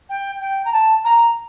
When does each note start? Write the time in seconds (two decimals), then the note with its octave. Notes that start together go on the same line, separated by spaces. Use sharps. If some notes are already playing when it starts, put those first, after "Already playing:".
0.09 G5
0.40 G5
0.65 A#5
0.73 A5
1.05 A#5